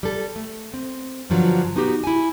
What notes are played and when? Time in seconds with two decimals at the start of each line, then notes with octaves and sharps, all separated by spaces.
0.03 G3 A4
0.36 A3
0.74 C4
1.30 G2 D3 F3 F#3
1.76 B3 D#4 F#4 G4
2.04 E4 G#5